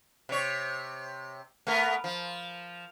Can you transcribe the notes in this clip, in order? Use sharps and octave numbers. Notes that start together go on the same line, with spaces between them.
C3 C#5
A3 B3 A#4
F3